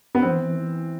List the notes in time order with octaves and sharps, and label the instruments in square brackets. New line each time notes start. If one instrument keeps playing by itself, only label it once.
[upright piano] B3
[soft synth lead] F3 [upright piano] C4
[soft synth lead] E3
E3
E3